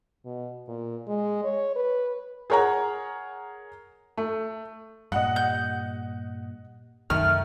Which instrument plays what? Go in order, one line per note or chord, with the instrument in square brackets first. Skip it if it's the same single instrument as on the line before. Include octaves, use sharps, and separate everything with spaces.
[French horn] B2
A#2
G#3
C#5
B4
[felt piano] G#4 A#4 C#5 F#5 A#5
A3
[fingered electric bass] G2 A#2 [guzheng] G3 [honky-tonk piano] D#5 F#5
[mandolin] G6
[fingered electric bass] C2 F#2 [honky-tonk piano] D#3 [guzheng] A3 [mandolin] F6